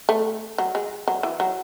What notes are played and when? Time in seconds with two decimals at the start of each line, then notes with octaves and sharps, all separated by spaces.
0.09 A3
0.58 F#3
0.75 G#3
1.08 F#3
1.23 E3
1.40 F#3